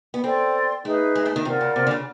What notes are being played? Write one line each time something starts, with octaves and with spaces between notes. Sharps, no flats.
B3
C4 A4 D5 G5 C6
A3 D#4 G#4 B4 E5
G#3
A3
D#3
C3 F4 A#4 D5 F#5
C#3
C3
D3
C#3